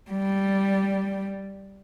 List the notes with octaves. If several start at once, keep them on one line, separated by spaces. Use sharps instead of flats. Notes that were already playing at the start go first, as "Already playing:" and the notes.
G3